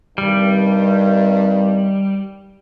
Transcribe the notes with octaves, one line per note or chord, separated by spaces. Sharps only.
G2 C3 D#3 G3